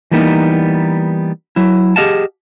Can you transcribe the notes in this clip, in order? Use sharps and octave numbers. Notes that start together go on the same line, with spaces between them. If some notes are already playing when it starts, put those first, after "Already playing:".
E3 G3 A#3 B3 C#4 D#4
F#3 E4
G4 G#4 D#5 F5 F#5 A5